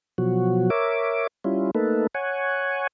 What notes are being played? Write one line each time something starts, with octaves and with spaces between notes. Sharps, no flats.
B2 F3 F#3 F#4
A#4 C#5 E5 D6
G3 C#4 E4 F4
A3 A#3 D#4 A4 B4
C#5 F#5 G#5